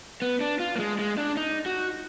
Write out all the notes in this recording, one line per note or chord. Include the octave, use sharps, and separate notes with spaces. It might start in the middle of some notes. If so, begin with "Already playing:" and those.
B3
D4
F4
A#3
G#3
G#3
D4
D#4
F#4